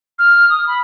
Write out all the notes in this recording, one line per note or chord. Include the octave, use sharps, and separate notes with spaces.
F6
D#6
B5